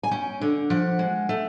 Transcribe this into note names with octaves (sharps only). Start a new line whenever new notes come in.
G#5
C#4 G5
D3
F3 F#5
G#3
A3